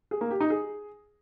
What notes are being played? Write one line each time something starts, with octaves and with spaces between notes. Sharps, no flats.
G#4
A#3
G4
D#4
G#4